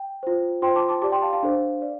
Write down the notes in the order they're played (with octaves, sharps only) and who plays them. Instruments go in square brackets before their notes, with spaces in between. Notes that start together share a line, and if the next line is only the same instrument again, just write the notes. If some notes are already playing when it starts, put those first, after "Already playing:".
Already playing: [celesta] G5
F4 C5
F4 C5 G5 C6
A5 D6
A5 D6
G4 D5 A5 D6
G5 C6
F5 A5
F5 A5
D4 A4 C5
D5